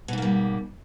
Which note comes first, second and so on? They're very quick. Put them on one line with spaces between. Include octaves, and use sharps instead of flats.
B2 G#2 A#3 G3